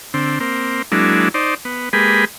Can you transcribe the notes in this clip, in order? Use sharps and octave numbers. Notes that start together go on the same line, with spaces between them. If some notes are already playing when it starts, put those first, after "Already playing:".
D3 C4
A#3 C4
F#3 G#3 A#3 D4 E4
D#4 C5 D5
B3
G#3 A#3 G4 G#4 B4 B5